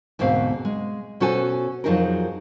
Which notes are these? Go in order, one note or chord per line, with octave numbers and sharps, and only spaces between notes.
D2 G#2 B2 C4 F5
G#3
B2 C#4 F#4 A4 C5 G#5
F2 F3 F#3 D#4 G#4 A#4